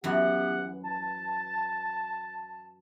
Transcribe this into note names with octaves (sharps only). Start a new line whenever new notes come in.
F#2 E3 B3 G4 F#5
A5